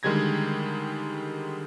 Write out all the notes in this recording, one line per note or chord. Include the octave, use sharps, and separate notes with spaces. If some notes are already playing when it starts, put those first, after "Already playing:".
D3 D#3 G3 G#3 G#6 A#6